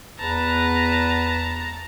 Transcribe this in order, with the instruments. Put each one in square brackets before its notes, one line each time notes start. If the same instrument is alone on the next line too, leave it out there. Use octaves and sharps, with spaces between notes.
[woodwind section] E2 [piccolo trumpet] B4 [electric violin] A5 A#5